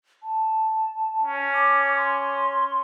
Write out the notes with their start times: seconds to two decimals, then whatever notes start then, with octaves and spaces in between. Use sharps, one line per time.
0.23 A5
1.23 C#4
1.54 D6
1.97 C6